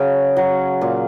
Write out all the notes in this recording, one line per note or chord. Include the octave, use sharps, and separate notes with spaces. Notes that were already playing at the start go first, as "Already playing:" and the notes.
Already playing: C#3 F#3
F#3
A#2